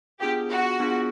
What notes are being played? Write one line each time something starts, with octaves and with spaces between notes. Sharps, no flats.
B3 D4 F4 G4 G#4
F#4
B3 D4 F4 G#4